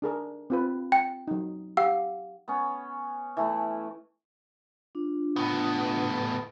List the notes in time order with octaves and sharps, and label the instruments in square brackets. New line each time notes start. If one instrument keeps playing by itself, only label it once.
[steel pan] D4 G#4 A#4
C4 F4 B4
[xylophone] G5
[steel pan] F#3 D#4
[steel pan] G4 [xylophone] F5 F#5 E6
[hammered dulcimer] B3 C#4
E3 A3 E4 B4
[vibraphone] D4 F4
[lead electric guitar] A2 B3